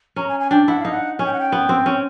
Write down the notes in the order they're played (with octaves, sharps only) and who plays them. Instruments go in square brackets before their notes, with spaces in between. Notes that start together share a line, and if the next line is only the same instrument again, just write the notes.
[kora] C#4 [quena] A#5
[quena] G#5
G#5
[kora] D4 [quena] G5
[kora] E4 [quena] F#5
[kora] D#4 [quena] F5
[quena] F#5
[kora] C#4 [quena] G#5
[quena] G5
F#5
G5
[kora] B3
C4
C#4